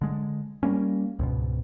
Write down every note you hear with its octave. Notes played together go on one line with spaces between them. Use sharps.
D3 G#3
G3 A#3 C#4
C#2 G#2 B2